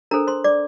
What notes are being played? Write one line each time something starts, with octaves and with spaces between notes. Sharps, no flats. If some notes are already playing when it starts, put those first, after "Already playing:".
D4 A4 A#4 C5 A#5
C5 C6
D5 D6